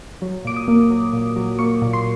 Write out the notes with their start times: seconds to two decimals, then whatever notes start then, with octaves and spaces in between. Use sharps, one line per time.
0.22 F#3
0.45 A#2 D6
0.57 D#6
0.68 A#3
0.90 F#3
1.13 A#2
1.36 F#3
1.59 A#3 C#6
1.82 A#2
1.93 C6